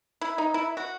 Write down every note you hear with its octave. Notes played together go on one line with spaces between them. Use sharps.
E4
D#4
E4
F#4